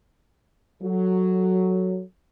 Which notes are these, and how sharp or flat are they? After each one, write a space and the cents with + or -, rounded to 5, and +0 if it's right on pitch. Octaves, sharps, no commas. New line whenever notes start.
F#3 +0 A4 +0